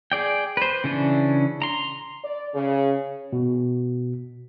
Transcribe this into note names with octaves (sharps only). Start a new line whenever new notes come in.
G#4 D5 G5
B4 C5
C#3 E3 C#4 D4
A#5 C6
D5
C#3
B2